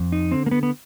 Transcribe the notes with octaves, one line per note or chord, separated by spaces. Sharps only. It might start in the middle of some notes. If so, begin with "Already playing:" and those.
Already playing: F2
D#4
D3 C4
A#3
B3
B3